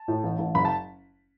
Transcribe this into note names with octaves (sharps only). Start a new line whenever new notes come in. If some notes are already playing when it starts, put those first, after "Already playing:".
Already playing: A5
A2
A1
A1
F#1 B5
A5